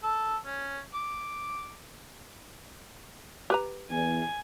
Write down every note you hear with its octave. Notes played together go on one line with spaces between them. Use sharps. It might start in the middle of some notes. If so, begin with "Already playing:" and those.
A4
C#4
D6
G4 B4 A#5
E2 G#5